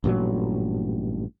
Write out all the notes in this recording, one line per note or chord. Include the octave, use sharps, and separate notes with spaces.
A1 G2 A#2 F#3